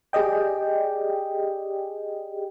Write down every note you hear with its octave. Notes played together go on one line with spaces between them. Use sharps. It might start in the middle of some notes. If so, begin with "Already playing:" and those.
G4 G#4 D5 D#5 G5